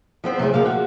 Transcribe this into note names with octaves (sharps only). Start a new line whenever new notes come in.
F3 B3 C4 C5
C3 F#3 A3 G#4
D2 F3 A#3 F5
F#4